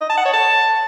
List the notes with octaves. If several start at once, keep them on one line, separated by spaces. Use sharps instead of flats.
D#5
A5
F#5
C#5
A5